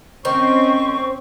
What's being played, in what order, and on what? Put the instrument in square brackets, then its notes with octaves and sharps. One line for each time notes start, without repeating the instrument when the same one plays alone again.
[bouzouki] D#3 [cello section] C4 C#4 [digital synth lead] C5 [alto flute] C#6